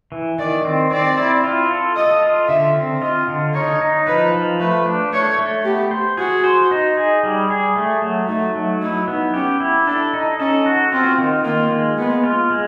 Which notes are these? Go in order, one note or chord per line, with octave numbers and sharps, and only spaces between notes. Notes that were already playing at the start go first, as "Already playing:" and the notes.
E3
D#3 D5
C4
C4 D5
E4
F4
A4
A4 D#5
F4
D3 E5
C4
F4 D#5
D3
D#4 C#5
D#4
F3 B4
F3
A3 B4
D4
A3 C#5
A3
B3 G4
C5
F#4 G#4
C5
D#4
G#4
G3
G#4
A3
F#3
A3 D#4
F#3
D#4 E4
B3
C#4 G4
E4
D4 A4
D#4
C#4 A4
F#4
C4 F4
D#3
A#3 F4
G#3
G#3 B3
F4
G#3